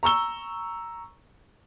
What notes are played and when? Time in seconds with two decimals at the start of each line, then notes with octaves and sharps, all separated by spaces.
0.03 A#5 C#6 E6 G7